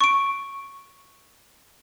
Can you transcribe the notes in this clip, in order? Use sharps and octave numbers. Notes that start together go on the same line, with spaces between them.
C#6 D7